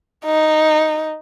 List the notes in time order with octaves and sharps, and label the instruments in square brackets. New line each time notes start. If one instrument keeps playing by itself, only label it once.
[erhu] D#4